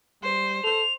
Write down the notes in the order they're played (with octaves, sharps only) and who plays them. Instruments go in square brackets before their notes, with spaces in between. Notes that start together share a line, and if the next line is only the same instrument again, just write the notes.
[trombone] G3 [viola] C5
[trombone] A4 [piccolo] F7